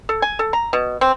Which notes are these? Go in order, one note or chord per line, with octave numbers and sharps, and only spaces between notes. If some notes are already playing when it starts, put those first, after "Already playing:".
A4
G#5
A4
A#5
B2
C4